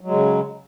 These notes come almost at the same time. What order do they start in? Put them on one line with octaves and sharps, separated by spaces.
F#3 G#3 C#3